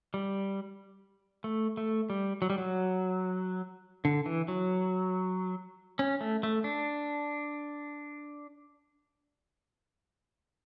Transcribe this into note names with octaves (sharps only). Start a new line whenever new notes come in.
G3
A3
A3
G3
F#3
G3
F#3
D3
E3
F#3
C#4
A3
A3
D4